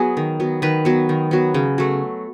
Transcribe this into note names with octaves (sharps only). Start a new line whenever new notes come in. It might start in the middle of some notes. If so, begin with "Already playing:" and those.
Already playing: F#3 B3 G#4
D#3
F#3 B3
D#3 B4
F#3 B3
D#3
F#3 B3
C#3
F#3 A3